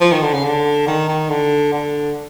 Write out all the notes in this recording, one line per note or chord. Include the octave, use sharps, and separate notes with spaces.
F3
D#3
D3
C#3
D3
D#3
D#3
D3
D3